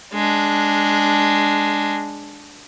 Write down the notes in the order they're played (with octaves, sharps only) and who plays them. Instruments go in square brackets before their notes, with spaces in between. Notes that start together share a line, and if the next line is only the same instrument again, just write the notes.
[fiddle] G#3 D4